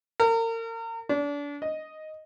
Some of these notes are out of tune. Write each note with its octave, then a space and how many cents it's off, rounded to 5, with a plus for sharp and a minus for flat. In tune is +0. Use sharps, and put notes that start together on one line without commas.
A#4 -35
D4 -30
D#5 +0